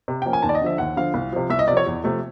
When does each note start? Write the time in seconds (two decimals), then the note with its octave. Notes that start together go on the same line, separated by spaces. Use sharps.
0.08 C3
0.22 F3 A#3 C#4 G5
0.33 G#5
0.43 D#2 A5
0.49 D5
0.55 D#5
0.62 D3 F3 E5
0.78 D#2 F#5
0.97 D3 F3 F5
1.14 C2
1.32 C3 F3
1.50 C2 E5
1.59 D#5
1.68 C3 F3 D5
1.77 C#5
1.87 E2
2.04 C3 F3 A3